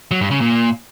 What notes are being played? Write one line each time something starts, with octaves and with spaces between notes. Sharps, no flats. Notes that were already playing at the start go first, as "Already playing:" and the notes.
F#3
G2
C#3
A#2